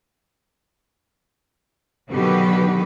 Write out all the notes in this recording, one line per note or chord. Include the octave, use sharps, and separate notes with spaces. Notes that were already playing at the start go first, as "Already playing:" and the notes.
B2 D3 D#3 F#3 G4 B4